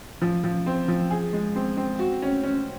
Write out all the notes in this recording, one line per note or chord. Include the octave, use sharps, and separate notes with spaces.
F3
F3
C4
F3
G#4
G#3
C4
C4
F#4
C#4
C#4